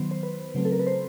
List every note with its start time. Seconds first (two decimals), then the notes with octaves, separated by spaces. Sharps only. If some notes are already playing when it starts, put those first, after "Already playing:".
Already playing: D#3 F#3 B3 C5
0.11 C5
0.23 B4
0.55 C#3 F#3 A3 C4
0.65 A4
0.72 A#4
0.79 B4
0.87 C5